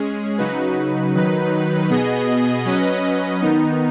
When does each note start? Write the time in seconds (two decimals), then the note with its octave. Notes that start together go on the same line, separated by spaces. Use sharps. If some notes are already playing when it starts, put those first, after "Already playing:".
Already playing: G#3 C#4 G#4
0.38 C#3 F#3 D#4 F#4 B4
1.14 D#3 F#3 D#4 B4
1.89 B2 B3 G#4 D#5
2.65 F#3 C#4 B4 D#5
3.41 D#3 B3 D#4